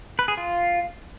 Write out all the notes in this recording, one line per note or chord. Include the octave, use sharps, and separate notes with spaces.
B4
G#4
F4